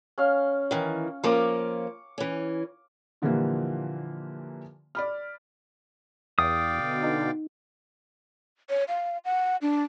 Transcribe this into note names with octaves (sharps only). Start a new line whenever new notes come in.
C#4 F5
D#3 E3
F3 A#3 C#4 C#6 D6
E3 C#4
A#2 D3 E3 F3 G3 A#3
D5 B5 F6
E2 D5 F5 G5 D#6
B2 D3
D#4
C#5
F5
F#5
D4